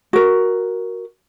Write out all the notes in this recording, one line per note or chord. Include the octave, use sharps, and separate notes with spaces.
F#4 A#4